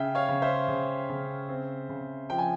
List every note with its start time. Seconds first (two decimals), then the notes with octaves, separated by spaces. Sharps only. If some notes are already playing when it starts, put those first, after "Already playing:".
Already playing: C#3 E5 G5
0.15 C#5 F5
0.29 C#3
0.42 C5 E5
0.68 C#3
1.09 C#3
1.49 C4
1.89 C#3
2.30 F3 G5
2.38 G#5